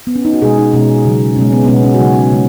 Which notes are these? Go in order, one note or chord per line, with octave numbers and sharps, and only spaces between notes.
B3
C#4
D#4
F#4
B2 G#3 G#4
D#4
B2 G#3 C#4
C#3 F#3
B2 G#3 C#4
B3
B3
B2 G#3 C#4
C#4
F#4
C#3 F#3 D#4
C#3 G#3